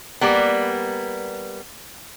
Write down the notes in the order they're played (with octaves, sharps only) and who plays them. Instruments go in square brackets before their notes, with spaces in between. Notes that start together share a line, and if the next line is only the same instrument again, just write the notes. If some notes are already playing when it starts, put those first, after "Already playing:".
[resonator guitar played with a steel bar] G3 A#3 B3